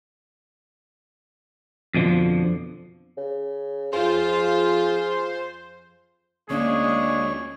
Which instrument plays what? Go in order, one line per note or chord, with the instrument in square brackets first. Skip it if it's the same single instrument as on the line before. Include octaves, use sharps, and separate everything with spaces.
[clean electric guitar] F2 B2 D3 F3
[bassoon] C#3
[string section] F2 F4 [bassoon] G#4 [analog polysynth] C5
[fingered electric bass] D2 C#4 [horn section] G#3 D4 G#4 [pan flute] A#3 [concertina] C#5 C#6